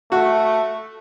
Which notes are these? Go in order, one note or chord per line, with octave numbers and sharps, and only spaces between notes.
A3 F#4